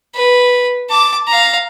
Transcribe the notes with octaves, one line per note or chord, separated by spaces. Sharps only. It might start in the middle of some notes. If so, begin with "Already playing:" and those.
B4
A5 D6
F5 A#5